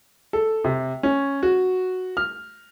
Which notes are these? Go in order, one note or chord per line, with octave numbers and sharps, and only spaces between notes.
A4
C3
C#4
F#4
F6